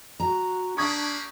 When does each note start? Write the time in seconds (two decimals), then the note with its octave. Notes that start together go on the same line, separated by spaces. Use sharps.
0.20 F#4 A#5
0.77 G3 A#3 D4 B5 C#6 D#6 G#6